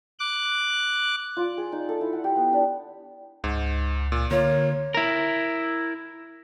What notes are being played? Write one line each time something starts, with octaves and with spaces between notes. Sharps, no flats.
D6 F#6
F4
G#4
D#4
A4
E4
F#5
G4
B3
D4
C#2 G#2
A#2
D3 A#3 F4 C#5
E4 A#4